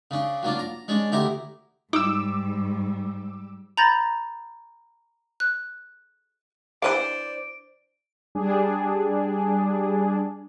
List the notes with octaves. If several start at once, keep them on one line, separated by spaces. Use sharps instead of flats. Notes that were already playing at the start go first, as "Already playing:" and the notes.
C#3 D4
F#3 A#3 D4 F4
A#5
G#3 C#4 D4
D2 E4 G4 C5 A#5 D6
G#2 G3 D#4 D6 E6
A#5 B5 G6 A6 A#6
F#6
E3 D4 B4 C5 D5 F5 D7
G3 D4 G#4